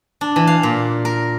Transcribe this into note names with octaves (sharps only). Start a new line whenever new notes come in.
D4
E3
F5
A#2
A#4